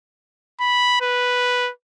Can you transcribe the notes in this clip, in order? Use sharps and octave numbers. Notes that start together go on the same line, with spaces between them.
B5
B4